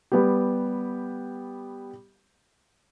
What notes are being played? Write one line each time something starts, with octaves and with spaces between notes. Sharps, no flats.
G3 B3 G4